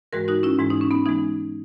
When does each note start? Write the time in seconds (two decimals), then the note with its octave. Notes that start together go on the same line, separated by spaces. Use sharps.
0.13 G#2 E3 G#3 F#4 A#4
0.28 D#4 F#4
0.43 C#4 E4
0.59 G#2 E3 G#3 E4
0.70 D#4
0.81 C#4
0.91 B3 D#4
1.06 E3 G#3 B3 D#4